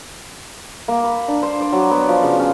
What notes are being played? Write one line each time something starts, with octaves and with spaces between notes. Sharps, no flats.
A#3
B5
D4
C5
D5
F#3
B3
F3
C#3
C#4